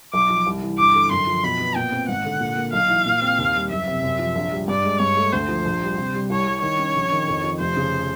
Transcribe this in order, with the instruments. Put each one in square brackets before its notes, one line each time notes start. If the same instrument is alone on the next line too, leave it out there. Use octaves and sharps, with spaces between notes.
[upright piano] B1 [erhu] D6
[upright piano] F3
C2
E3
[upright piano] G1 [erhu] D6
[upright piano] D3
[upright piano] F#2 [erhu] C6
[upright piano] F3
[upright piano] B2 [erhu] B5
[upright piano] B3
[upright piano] A#2 [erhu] G5
[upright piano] C4
[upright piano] G#1 [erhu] F#5
[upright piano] D3
A#2
A#3
[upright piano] B1 [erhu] F5
[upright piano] E3
A#2
C4
D#2
G3
[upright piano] F#1 [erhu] E5
[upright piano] C3
F#2
F3
A#1
G3
[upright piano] G2 [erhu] D5
[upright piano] G#3
[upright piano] G2 [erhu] C#5
[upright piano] A3
[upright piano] D2 [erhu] C5
[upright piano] F3
A#1
G3
C3
G3
[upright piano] C2 [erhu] C#5
[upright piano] G3
[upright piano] D#3 [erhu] C#5
[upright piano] C#4
A#1
D#3
F2
F3
[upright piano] F1 [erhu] C5
[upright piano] C#3